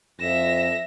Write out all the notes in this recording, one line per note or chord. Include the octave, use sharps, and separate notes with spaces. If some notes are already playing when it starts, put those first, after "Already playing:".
F2 E5 A#6 E7